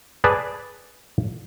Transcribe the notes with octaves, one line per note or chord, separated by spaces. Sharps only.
G#4 B4 D5 A5